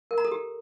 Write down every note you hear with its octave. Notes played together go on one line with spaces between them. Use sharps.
A#4
A#5
A4
G4